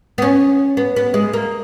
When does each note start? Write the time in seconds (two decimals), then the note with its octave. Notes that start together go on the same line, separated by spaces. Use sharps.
0.18 B3
0.22 C#4
0.77 B3
0.96 B3
1.14 G#3
1.33 A#3